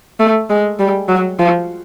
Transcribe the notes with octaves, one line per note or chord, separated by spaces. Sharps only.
A3
G#3
G3
F#3
F3